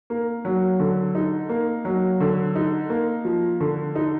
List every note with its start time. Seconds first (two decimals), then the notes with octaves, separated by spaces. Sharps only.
0.10 A#3
0.45 F#3
0.80 D3
1.15 D#4
1.49 A#3
1.85 F#3
2.21 D3
2.56 D#4
2.90 A#3
3.25 F3
3.60 D3
3.96 D#4